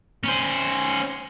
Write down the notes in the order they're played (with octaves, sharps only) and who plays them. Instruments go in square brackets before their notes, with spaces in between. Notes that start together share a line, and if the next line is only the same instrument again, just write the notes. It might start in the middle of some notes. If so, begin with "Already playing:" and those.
[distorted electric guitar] C#4 C5